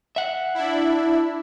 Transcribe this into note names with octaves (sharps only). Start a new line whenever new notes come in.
E5 F#5
D4 E4